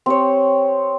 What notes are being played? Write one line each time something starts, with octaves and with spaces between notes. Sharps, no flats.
C4 G4 C#5